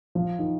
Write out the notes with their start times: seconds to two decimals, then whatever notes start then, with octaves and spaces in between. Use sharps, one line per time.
0.15 F3
0.39 D#3